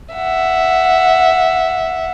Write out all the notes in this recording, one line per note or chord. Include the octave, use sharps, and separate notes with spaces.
E5 F#5